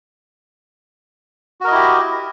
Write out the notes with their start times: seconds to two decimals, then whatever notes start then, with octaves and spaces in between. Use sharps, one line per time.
1.61 F#4
1.64 A#4
1.68 D#5
1.71 E4
1.75 G4